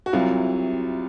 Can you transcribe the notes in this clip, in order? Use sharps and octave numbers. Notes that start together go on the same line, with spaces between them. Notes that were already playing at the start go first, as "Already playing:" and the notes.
F#4
C2 C3 F#3 F4